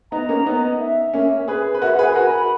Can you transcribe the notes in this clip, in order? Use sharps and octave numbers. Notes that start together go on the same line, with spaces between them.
B3 D#4 A#5
A#3 C#4
B3 D#4
E5
A#3 C#4
G#4 B4
B4
F#4 A#4 E5
F#5
G#4 B4
G#5
F#4 A#4
B5
B5